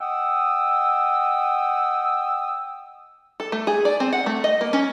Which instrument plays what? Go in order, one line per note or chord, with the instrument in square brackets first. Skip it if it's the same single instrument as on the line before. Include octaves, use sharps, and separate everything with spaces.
[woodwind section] D#5 F#5 G5 D#6 E6
[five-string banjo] A4
A3
G#4
D5
C4
F#5
A3
D#5
A#3
C#4